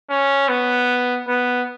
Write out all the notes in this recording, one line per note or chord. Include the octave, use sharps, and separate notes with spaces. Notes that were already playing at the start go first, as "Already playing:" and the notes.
C#4
B3
B3